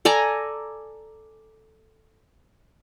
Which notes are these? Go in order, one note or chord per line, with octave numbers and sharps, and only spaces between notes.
A4 D5 G#5 A#5